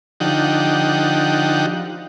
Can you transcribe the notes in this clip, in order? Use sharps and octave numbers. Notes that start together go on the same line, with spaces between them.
D3 F3 D#4 G4 F#5